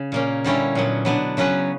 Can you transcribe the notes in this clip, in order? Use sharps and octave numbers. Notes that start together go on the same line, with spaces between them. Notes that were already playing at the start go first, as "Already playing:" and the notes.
Already playing: C#3
A#2 A#3 C#4
D3 G3 C#4 E4
A#2 F#3 B3
B2 F#3 B3 D4
C#3 F#3 C#4 F#4 B4